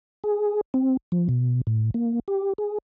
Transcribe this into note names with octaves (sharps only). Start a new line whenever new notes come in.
G#4
C4
F3
B2
A2
A#3
G4
G#4